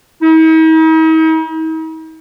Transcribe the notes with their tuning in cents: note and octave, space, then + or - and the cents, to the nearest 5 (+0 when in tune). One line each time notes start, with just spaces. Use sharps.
D#4 +45